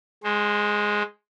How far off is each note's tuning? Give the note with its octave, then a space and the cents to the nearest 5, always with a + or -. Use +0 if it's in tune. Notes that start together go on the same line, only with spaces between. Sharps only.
G#3 +0 C5 +20